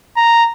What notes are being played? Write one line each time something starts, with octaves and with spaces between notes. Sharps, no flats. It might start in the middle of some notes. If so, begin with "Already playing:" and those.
A#5